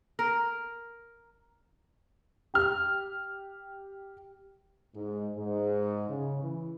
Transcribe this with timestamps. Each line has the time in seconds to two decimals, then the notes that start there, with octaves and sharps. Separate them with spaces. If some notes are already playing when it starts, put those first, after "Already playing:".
0.19 A#4
2.54 G4 F6
4.95 G#2
5.37 G#2
6.09 C#3
6.42 E3